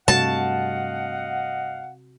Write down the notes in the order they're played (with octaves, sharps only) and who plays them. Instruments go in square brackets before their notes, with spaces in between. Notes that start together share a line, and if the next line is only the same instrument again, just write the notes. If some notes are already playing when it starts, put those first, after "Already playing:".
[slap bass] G2 A3 [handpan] C3 F#4 [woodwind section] D#5 F5 F#5 [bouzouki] A5